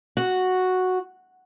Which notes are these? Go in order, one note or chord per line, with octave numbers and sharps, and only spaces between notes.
F#4